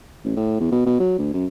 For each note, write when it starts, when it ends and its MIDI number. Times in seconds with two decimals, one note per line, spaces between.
0.24 0.34 33
0.36 0.60 45
0.60 0.68 40
0.72 0.82 47
0.86 0.99 47
1.00 1.15 54
1.19 1.32 38
1.34 1.46 42